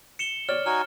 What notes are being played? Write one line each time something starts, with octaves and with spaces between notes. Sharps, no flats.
C#7 E7 G7
C#5 D5 F6
D#4 F#4 G#5 F6